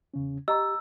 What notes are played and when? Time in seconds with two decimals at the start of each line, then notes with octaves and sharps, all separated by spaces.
0.14 E2 C#3 C#4
0.48 G4 D#5 A#5 C#6 E6